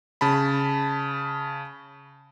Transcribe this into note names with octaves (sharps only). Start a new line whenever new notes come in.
C#3 A5 B5